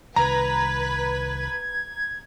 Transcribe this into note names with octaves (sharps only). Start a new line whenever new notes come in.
C2 D#3 B4 A#5 G#6